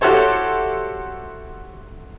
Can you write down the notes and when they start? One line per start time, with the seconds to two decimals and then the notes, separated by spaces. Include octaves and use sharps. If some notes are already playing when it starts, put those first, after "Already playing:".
0.01 E4 F#4 G4 A4 C5 C#5